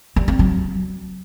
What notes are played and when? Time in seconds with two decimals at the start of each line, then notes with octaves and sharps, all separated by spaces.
0.16 G3
0.28 C4
0.39 F#3